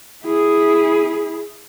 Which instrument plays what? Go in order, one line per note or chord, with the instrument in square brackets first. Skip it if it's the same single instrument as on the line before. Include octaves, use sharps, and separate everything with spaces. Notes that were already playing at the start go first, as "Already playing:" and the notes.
[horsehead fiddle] E4 G#4